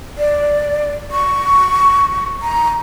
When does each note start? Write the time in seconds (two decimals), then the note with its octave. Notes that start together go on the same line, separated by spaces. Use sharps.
0.18 D5
1.11 C#6
2.42 A#5